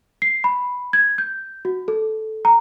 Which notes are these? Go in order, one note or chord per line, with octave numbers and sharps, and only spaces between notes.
C7
B5
G#6
G6
F#4
A4
A#5